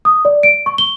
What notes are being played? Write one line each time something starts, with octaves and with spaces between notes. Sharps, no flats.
D#6
D5
D7
C#6
G7